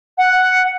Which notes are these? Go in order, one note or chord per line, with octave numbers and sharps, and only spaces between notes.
F#5